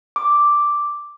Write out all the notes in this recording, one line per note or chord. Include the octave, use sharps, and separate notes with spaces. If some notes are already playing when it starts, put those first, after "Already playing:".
D6